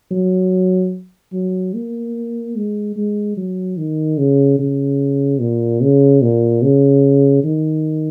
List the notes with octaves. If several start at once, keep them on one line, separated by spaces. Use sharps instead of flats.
F#3
F#3
A#3
G#3
G#3
F#3
D#3
C#3
C#3
A#2
C#3
A#2
C#3
D#3